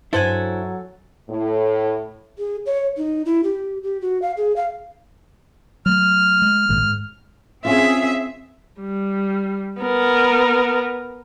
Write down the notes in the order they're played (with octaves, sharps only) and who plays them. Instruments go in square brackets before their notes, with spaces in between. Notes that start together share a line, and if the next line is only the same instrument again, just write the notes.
[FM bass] G2 [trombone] F#3 [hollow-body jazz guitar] E4 C5 [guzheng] A4 F#5 G#5
[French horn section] A2
[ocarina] G#4
C#5
D#4
E4
G4
G4
F#4
F5
G#4
F5
[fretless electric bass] F#3 A3 [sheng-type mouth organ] F6
[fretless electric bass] G#3
A#1 G#2 D#3
G#2
[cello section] C4 G#4 [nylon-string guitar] C#4 F4 [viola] E5
[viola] G3
B3 A#4